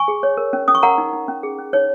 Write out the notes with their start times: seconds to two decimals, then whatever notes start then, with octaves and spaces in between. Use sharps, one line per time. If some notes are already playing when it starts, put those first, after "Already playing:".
Already playing: G#5 C#6
0.08 G#4
0.23 C#5
0.37 A#4
0.53 C#4
0.68 C#4 D#6
0.75 C#6
0.83 A#4 F#5 A#5
0.98 D#4
1.13 D#4
1.28 C#4
1.43 G#4
1.58 C#4
1.73 D#4 C#5